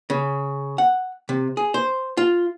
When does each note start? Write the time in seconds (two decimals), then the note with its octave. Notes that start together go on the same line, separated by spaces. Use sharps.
0.10 C#3
0.78 F#5
1.29 C3
1.57 G#4
1.74 C5
2.17 F4